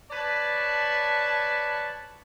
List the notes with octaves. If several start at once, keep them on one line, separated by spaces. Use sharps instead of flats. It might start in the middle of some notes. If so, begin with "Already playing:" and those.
B4 C#5 D5 A5